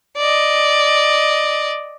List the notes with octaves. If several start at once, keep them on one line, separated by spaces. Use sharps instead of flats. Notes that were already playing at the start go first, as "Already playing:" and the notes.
D5 D#5